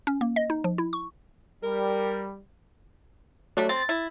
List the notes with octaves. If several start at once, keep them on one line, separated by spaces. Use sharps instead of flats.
C#4
A#3
D#5
D#4
F3
E4
C#6
G3 A#4
F#3 G3 A3 D4
C4 A6
E4